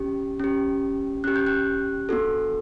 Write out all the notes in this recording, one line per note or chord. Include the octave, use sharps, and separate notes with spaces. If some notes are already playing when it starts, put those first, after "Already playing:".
Already playing: C#4 G4
C#4 G4
C#4 G4 F#6
G6
F#6
B3 D4 F#4 A4